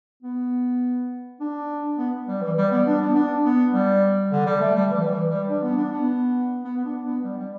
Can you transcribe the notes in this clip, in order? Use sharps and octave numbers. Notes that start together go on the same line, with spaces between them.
B3
D4
B3
G3
E3
G3
B3
D4
B3
D4
B3
G3
D3
G3
A3
G3
E3
G3
E3
G3
D4
B3
D4
B3
B3
B3
D4
B3
G3
G3